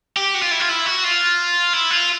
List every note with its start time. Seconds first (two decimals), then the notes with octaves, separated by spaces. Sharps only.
0.16 G4
0.34 F#4
0.42 F4
0.51 E4
0.60 F4
0.69 E4
0.86 F#4
1.04 F4
1.73 E4
1.91 F4